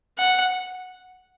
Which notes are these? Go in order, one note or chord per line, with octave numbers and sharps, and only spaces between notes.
F#5